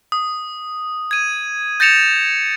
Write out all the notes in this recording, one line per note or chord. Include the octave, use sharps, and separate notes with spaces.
D#6
G#6 D#7
G6 A6 A#6 C#7 E7 F7